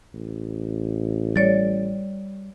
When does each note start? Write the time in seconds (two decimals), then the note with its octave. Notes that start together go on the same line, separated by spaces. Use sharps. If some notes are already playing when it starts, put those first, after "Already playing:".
0.14 A1
1.36 G3 C#5 D5 A6